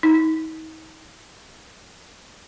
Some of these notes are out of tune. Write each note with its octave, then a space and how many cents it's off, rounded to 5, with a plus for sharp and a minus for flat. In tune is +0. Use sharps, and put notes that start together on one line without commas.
D#4 +40